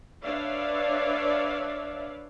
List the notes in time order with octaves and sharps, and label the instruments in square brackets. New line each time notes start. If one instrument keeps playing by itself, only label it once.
[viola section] D4 B4 C#5 D5 E5 F5